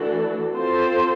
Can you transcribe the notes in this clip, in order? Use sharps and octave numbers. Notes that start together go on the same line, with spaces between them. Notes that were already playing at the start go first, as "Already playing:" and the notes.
Already playing: E3 A3 D4 F#4 A4
C4 F4 A4 C5